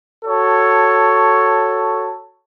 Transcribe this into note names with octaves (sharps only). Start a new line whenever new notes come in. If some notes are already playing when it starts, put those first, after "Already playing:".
F#4 A4 C#5 A5